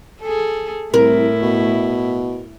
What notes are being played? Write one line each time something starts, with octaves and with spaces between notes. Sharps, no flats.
G#4 A4
C2 A2 E4 A#4
B2